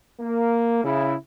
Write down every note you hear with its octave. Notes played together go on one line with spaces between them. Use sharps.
A#3
C#3 E4